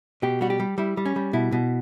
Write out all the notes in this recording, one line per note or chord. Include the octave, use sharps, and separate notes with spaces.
B2 G4
G3 F#4
G4
G3
G3 E4
G3
C#4
G3
B2 E4
B2